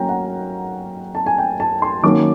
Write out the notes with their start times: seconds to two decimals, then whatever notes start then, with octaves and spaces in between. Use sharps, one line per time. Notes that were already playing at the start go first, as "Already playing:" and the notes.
Already playing: F#3 A#3 C#4 G5 A#5
0.09 F#5
1.15 A5
1.26 G#5
1.38 G5
1.60 A5
1.82 C6
2.03 D#3 F#3 A#3 C#4 D6